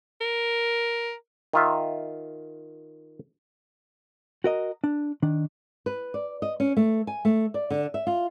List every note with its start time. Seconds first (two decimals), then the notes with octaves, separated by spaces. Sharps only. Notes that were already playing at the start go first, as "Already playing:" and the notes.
0.21 A#4
1.53 D#3 F4 E5
4.44 F#4 A#4 D#5
4.84 D4
5.22 D#3 D4
5.86 B4
6.14 D5
6.42 D#5
6.60 C#4
6.77 A3
7.07 G#5
7.25 A3
7.54 D5
7.70 D3
7.94 E5
8.07 F4